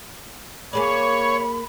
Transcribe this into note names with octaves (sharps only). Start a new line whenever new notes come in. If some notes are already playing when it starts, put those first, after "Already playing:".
A#3 G#4 C#5 D5 B5